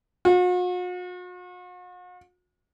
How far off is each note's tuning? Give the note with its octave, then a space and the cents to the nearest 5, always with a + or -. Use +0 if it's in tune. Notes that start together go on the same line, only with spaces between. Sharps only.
F#4 -45